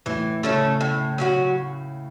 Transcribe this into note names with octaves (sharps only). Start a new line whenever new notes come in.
A2 E3
C#3 A3 C#4 A4
A2
F#3 C#4 F#4